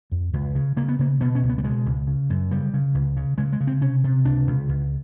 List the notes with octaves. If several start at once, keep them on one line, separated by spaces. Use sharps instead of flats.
F2
C#2
C#3
C#3 A#3
B3
C#3 A#3
B2 B3
C#4
C#2
B3
G3
B2 G#3
C#2
C#3
F#2
C#3 G3
C#3
C#2
C#3
C#3 G#3
G#3
C#3
C4
C3 C#4
C3
C#2 D4
C#2
C#2